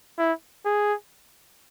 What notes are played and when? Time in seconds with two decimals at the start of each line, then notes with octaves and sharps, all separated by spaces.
0.18 E4
0.65 G#4